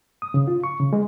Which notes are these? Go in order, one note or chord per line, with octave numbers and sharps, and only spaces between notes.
D#6
C#3
F4
C#6
C#3
G#3